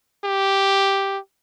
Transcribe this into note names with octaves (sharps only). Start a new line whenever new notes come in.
G4